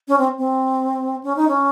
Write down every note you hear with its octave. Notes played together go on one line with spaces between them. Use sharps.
C#4
C4
C4
C#4
D#4
C#4